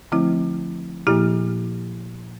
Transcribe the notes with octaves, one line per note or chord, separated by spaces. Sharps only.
D3 F3 A3 C4 E4
A#2 F3 A#3 E4 G4